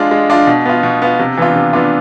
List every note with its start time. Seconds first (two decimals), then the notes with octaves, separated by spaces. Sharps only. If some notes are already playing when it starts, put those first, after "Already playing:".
Already playing: G#3 D4 F4
0.11 G#3
0.30 D4 F4
0.47 B2
0.65 B3 F4
0.83 B2
1.02 B3 F4
1.19 C3
1.37 E3 B3 D4 F4
1.56 C3
1.73 E3 B3 D4 F4